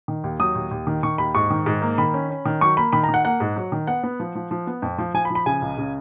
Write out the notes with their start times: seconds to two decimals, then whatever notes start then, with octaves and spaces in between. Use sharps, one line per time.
0.08 D#3
0.24 D#2
0.40 F#3 D#6
0.55 D#2
0.71 D#2
0.87 D#3
1.03 D#3 C#6
1.18 D#2 B5
1.35 G#2 C#6
1.50 D#3
1.66 G#2
1.82 A#3
1.98 D#3 B5
2.14 C#4
2.30 C#4
2.45 D#3
2.61 F#3 C#6
2.77 A#3 B5
2.93 D#3 B5
3.03 A#5
3.09 D#3
3.14 F#5
3.25 A#3 F#5
3.40 G#2
3.56 F#3
3.72 D#3
3.87 B3 F#5
4.03 B3
4.20 F3
4.35 F3
4.51 F3
4.67 B3
4.82 F2
4.98 F3
5.14 F3 G#5
5.25 B5
5.30 F3
5.35 B5
5.46 C#3 G#5
5.62 C#2
5.78 C#3